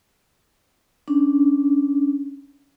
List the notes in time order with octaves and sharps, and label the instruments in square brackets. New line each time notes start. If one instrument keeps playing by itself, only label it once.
[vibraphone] C#4 D4